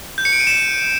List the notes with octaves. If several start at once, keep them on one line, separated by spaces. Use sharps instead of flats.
G6
C#7
D7
D#7
E7